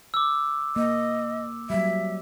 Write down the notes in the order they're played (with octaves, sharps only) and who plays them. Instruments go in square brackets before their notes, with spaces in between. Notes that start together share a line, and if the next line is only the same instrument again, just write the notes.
[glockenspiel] D6 E6
[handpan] A#3 [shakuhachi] D#5
[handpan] F#3 G3 [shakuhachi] E5